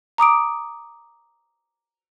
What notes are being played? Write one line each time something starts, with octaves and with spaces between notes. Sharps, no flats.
A#5 D6 D#6 D7